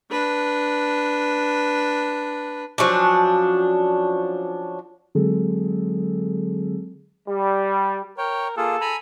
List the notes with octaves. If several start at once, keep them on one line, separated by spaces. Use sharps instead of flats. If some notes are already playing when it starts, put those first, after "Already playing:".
D4 B4
F3 F#3 C#4 D4
D3 F#3 G#3 C4 G#4 A4
G3
A#4 C#5 G5
A#3 F4 G#4 A4
G#5 A#5 B5